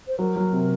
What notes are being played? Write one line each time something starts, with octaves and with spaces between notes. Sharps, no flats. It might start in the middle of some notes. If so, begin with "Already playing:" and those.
C5
F#3 A#4
F#3
C3